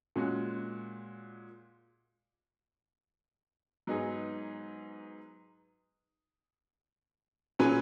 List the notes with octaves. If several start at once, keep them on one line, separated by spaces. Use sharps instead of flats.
A#2 G#3 C#4 F#4
G#2 F#3 B3 D#4 G#4
A#2 F#3 C#4 G#4 B4